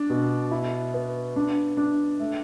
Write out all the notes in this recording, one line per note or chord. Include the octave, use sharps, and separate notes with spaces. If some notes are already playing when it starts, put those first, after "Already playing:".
Already playing: D4
B2
E4
B3
D4
D4
A3